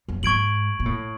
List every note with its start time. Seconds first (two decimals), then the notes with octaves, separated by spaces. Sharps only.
0.08 F#2
0.23 G#2 C#6 G#6 D7 F#7
0.79 B2
0.85 A2